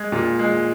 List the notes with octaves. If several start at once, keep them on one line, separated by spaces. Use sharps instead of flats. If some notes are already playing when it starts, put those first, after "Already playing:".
Already playing: G#3 G#6
A#2
G#3